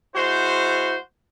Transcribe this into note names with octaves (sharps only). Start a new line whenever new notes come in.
G#3 E4 F#4 C5